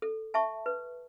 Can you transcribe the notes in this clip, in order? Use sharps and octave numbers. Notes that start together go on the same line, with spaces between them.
A4
E5 A5 C#6
B4